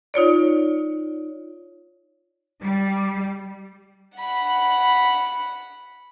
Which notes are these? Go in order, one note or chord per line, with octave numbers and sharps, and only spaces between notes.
D#4 F4 C#5 D5
G3
F#5 B5